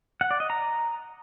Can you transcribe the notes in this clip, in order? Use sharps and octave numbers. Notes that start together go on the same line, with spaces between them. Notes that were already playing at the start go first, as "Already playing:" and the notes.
F#5
D5
D#5
A#5